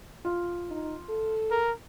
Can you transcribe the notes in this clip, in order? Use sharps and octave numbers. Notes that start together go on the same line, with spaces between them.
F4
D#4
A4
A#4